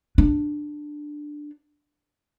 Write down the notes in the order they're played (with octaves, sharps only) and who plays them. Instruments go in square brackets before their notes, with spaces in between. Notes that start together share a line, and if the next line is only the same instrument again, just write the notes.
[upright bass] D4